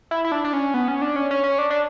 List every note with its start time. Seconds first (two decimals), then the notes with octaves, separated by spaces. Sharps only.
0.11 E4
0.24 E4
0.32 D4
0.44 D4
0.53 C#4
0.74 B3
0.88 C#4
1.02 D4
1.16 C#4
1.31 C#4
1.44 C#4
1.58 D4
1.70 D4